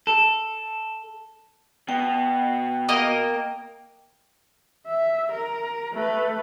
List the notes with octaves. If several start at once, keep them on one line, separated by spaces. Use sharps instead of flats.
A4
B2 G5
A#3 A#4 D#5
E5
A#4
A3 B4